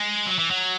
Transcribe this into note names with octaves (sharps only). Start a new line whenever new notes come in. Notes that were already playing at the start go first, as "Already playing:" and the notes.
Already playing: G#3
F#3
E3
F#3